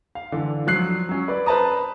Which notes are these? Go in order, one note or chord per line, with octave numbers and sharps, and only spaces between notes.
F5
D3 E3 D4
F3 F#3 F#6 C7
F#3 C#4
B4 D5
B4 C5 A5 A#5 D#6